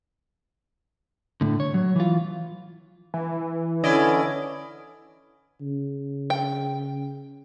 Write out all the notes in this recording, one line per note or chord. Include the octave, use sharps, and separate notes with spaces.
A2 D3
C#5
F#3
E3 F4
E3
D3 C#4 E4 D5 D#5
C#3
G5